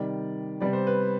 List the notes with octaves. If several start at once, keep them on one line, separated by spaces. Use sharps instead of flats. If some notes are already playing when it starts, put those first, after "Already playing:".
Already playing: C3 D#3 G3 D5
C3 G3 B3 D5
C5
B4